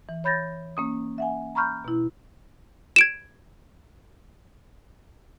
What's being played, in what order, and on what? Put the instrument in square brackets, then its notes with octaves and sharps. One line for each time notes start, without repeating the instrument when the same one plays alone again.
[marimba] E3
C#5 B5 G6 A6 A#6
A#3 C#4 D#6
E5 F#5 G#5
A#5 B5 C#6 F6 G6
B2 E4
[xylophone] G#6 D7 E7